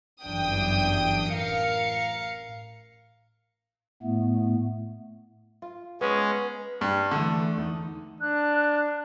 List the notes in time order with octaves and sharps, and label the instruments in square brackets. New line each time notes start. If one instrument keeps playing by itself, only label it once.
[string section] G1 F#2 E3 D4 G5 D#6
A1 A#4 F5 C#7
[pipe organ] A2 A3 B3
[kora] F4
[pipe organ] G#3 C#4 [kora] B3
[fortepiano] G2
[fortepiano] D3 [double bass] E3 A3
[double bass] E2 D#4
[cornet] D4 [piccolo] F#6